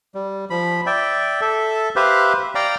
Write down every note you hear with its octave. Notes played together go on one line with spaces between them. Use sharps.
G3
F3 B5
D5 E5 G5
A4 E5
G4 B4 C5 E5 F5
D5 F5 G5 A#5